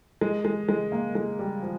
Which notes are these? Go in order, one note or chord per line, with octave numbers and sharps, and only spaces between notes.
G#3
G#3
G#3
A#3
G#3
G3
F3